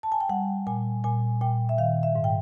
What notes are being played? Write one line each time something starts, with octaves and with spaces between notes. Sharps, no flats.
A5
G#5
G5
G3 F#5
A#2 G#5
A#2 G#5
A#2 G5
E5
D#3 F5
E5
G#2
G5